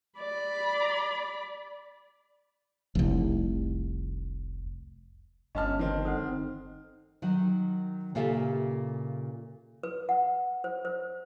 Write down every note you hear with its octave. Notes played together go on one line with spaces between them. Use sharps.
D5 B5
F1 C2
G1 C#4 D#5 A5 F6
D#3 C4
A4 C5 F#5
D#3 F#3
A#2 C#3 G4 A4 E5
B4
F#5
C5
C5